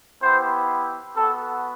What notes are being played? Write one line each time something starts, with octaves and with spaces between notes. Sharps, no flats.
B3 E4 G4 C5
B3 F#4 A4